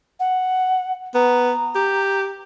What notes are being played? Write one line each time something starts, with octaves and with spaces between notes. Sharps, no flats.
F#5
B3 A#5
G4